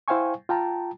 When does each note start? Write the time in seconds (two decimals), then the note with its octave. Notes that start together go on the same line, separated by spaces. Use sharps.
0.08 E4 C5 F5 G5 G#5 C#6
0.49 F4 G5 A5 A#5